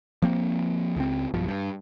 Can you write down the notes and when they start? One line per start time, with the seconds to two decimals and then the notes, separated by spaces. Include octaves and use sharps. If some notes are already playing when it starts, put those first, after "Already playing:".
0.22 F3 A#3 C4
0.96 C#2 C4
1.34 B1 G2 F3
1.48 G2